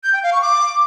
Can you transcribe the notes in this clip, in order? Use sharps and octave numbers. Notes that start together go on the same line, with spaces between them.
G6
G5
F5
C#6
D6